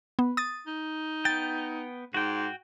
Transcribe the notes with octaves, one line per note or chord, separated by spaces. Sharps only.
B3
D#6 A6
D#4
B3 G5 A6
G#2 F#4 G5